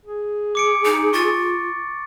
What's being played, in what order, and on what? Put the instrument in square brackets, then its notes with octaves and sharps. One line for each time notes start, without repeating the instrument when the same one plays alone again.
[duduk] G#4
[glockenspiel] D6 C#7 D7
[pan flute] D#4
[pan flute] F4 [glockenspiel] C#6 A6